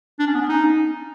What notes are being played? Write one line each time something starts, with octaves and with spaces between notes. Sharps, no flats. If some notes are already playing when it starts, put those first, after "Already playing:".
D4
C#4
B3
C#4
D#4